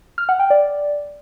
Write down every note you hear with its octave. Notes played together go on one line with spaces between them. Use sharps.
F6
F#5
G5
D5